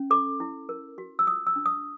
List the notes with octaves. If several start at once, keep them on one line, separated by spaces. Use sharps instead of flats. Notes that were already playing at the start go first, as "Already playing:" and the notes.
Already playing: C#4
A4 D6
E4
A#4
F#4
E6
F4 D#6
E6
D4
D#6